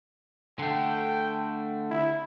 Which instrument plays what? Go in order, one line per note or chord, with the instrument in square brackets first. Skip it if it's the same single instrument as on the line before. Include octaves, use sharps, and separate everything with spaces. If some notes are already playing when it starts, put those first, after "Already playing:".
[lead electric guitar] D3 A3 [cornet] G5
[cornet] E4